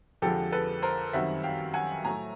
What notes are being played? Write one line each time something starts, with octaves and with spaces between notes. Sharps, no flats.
F2 D3 F3 G#3 G4 A4
A4 B4
A#4 C5
F#2 D#3 G3 C4 E5 F#5
F5 G5
F#5 G#5
A2 F#3 A3 G#5 A#5